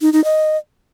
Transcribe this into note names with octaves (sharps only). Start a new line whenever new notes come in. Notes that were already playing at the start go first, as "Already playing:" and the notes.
D#4
D#4
D#5